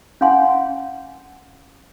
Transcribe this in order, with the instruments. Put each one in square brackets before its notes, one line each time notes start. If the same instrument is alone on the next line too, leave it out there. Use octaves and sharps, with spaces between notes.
[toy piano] C#4 F5 F#5 G#5 C6